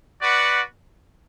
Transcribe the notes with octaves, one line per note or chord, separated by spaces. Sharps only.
F#4 B4 D5 F#5